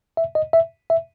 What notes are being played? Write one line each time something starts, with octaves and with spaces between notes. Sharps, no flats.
E5
D#5
E5
E5